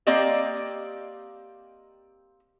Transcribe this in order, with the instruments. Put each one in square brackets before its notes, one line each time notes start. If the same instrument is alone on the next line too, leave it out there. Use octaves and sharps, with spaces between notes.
[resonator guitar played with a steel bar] A#3 C4 G4 D5 D#5